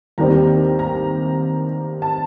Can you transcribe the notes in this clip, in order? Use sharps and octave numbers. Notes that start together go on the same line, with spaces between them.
D#2 D#3 G3 C4 A#5
A#5
A5